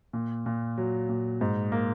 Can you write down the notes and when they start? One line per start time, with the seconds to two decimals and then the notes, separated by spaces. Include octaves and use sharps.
0.13 A#2
0.46 A#2
0.78 F#3
1.09 A#2
1.41 G#2
1.72 A#3